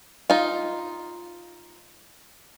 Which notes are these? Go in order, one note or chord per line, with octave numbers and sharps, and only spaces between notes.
D#4 F4